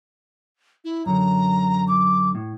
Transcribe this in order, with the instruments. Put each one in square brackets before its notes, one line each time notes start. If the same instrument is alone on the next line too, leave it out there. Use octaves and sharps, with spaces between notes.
[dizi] E4
[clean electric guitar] F#2 D3 [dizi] A#5
[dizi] D6
[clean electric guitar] A2